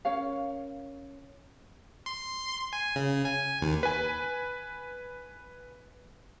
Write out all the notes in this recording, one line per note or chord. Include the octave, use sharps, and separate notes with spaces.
C#4 A#4 C#5 F5
C6
G#5
C#3
G#5
D#2
B4 G#5